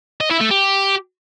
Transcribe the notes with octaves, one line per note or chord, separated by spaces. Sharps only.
D#5
E4
A3
G4